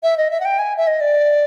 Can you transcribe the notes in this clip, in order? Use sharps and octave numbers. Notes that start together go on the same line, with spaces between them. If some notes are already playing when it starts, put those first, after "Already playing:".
E5
D#5
E5
F#5
G5
G#5
E5
D#5
D5